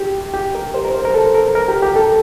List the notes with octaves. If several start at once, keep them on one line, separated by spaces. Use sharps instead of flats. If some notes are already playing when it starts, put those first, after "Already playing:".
Already playing: G4
G4
A#4
C5
A#4
C5
A#4
A4
A#4
A#4
G4
G4
A4